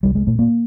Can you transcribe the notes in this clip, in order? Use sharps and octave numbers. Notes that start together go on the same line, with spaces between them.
C2 G3
G#3
A#2 A3
A#3